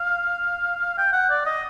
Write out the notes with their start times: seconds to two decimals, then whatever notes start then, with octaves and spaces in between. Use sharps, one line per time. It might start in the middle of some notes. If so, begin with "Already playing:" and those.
Already playing: F5
0.97 G5
1.13 F#5
1.30 D5
1.46 D#5